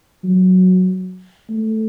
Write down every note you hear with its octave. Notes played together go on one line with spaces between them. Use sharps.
F#3
A3